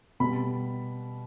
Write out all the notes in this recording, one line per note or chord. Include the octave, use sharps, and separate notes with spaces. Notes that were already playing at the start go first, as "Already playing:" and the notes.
B2 G3 B5